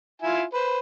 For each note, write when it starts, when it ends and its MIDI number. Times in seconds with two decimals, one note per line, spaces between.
0.22 0.43 64
0.22 0.43 65
0.22 0.43 80
0.54 0.80 71
0.54 0.80 72